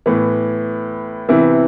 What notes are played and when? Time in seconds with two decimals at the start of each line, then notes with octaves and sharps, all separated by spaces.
0.06 A2 E3 B3
1.29 C3 E3 B3 E4